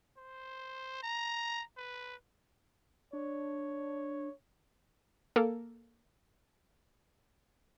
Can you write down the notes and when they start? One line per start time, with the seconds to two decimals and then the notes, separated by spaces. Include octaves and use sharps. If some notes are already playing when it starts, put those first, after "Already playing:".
0.17 C5
1.03 A#5
1.77 B4
3.13 D4 C#5
5.36 A#3 A4 A#4